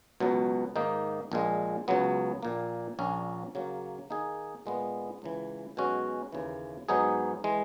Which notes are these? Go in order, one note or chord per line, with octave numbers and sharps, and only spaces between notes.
C#2 B2 F#3 B3
G#2 D#3 A#3 D#4
A#1 A#2 G#3
C#2 C#3 F#3 B3
A#1 A#2 A#3
A#1 A#2 A#3 C#4
C#3 F#3 A#3
D#3 A#3 D#4 G#4
A#2 G#3 B3
C#2 C#3 E3
B1 B2 G#3 C#4 F#4
D#2 C#3 E3
G#2 F#3 B3 D#4 G#4
E3 G#3